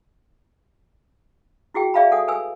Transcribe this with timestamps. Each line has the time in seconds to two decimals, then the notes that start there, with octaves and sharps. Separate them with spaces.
1.74 E4 F#4 G#4 G5
1.94 G#4 D5 E5 F5 A5 B5
2.12 A4 F#5 G#5 D#6
2.28 A4 B4 G#5 E6